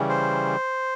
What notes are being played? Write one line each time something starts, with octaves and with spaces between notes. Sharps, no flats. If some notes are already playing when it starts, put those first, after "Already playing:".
Already playing: C#3 E3 G3
C5